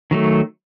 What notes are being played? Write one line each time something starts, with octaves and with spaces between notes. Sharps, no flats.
D#3 F#3 A3